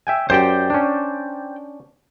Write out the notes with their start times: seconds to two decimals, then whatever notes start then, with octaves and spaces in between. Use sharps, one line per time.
0.07 E5 G5 G#5
0.30 F#2 G4 C5 D5 G5
0.70 C#4 D4